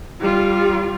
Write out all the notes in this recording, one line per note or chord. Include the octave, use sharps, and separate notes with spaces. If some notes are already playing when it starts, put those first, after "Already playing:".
G3 F4